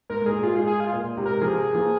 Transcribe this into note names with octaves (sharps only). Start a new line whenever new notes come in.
G#2 A#4
G#2
A#2 G#4
G#2 F4
G#4
G#4
F4
A#2
G#2 C3
A#4
C3 F3 G#4
F3 A#3